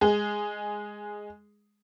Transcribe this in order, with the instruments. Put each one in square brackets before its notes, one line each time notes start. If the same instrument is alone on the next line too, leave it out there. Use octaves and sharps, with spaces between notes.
[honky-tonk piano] G#3 G#4